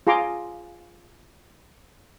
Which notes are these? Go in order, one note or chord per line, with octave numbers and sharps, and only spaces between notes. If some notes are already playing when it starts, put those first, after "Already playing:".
F4 G#4 A#5 C6 D6